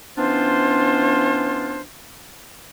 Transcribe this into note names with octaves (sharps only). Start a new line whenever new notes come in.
E3 B3 C#4 D4 F4 C5